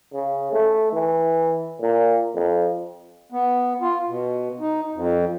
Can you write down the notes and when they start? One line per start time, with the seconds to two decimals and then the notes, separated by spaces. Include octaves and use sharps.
0.13 C#3
0.52 A3
0.93 E3
1.81 A#2
2.34 F2
3.32 B3
3.81 F4
4.08 B2
4.60 D#4
4.94 F2